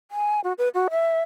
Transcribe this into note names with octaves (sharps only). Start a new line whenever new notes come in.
G#5
F#4
B4
F#4
E5